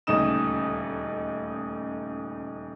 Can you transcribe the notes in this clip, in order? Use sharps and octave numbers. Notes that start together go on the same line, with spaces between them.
D#1 D2 C#3 D#4 D#6 E7